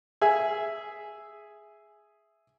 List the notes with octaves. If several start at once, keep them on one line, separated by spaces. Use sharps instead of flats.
G#4 E5 G#5